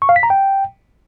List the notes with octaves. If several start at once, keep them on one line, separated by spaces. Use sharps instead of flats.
C#6
F5
B6
A#5
G5